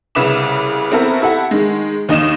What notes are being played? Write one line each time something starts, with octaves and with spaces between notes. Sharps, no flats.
C2 C#3 B4 E5 D6 E7
B3 C4 E4 F#4 A4 A#4
E4 G4 A4 E5 F#5
D#3 G#3
D#2 D#4 D#5 E7